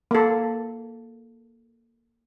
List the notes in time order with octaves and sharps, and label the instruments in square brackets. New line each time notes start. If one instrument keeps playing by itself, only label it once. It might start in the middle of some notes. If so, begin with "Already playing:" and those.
[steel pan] A#3 A4